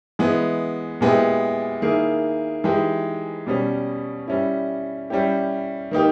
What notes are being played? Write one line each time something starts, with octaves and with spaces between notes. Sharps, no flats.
E3 G#3 B3
A#2 G#3 B3 E4 G4
D#3 A#3 E4 G#4
E3 G#3 D#4 G4
B2 G3 C#4
G3 C#4 E4
G3 C#4 E4 G4
D#3 A#3 D#4 G4